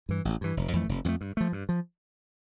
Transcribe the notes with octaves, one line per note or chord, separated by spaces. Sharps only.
G2 E3
A1
G2 E3
F1
F2 E3 A3
F1
F2 E3 A3
G2
F3 A3
G2
F3